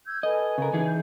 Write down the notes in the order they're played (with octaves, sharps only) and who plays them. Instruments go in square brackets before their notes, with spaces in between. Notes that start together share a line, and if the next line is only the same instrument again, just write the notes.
[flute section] E6 G6 G#6
[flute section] A4 B4 G#5 [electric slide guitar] D#5
[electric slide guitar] C#3 A#4
E3 D#4 G#4
[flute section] G6